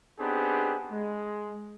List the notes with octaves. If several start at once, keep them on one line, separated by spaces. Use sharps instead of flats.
B3 C4 D4 D#4 G4 G#4
G#3